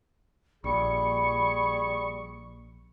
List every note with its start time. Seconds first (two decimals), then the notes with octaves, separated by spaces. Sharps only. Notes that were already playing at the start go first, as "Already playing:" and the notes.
0.64 A#1 G3 G#4 B5 C#6